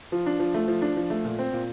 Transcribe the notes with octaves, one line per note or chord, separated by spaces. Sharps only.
F3
D4
F3
A3
F3
D4
F3
A3
A#2
C4
A#2